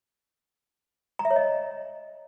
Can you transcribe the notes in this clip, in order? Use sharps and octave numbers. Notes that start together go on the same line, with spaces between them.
A#5
E5
C#5
D#5